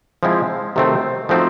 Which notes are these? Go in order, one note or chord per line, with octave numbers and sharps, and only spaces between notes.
F3 G#3 C4 E4
C3 D#3 F#3 A3 C4
F3 A3 C4 D#4 F#4